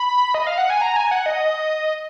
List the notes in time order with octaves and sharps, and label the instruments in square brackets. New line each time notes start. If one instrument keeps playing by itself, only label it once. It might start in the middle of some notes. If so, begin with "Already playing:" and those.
Already playing: [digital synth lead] B5
D#5
F5
F#5
G#5
A#5
G#5
F#5
D#5